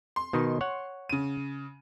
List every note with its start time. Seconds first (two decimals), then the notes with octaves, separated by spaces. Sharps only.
0.16 C6
0.33 B2 D#3 D#4
0.61 C#5 F#5
1.09 C#3 D#7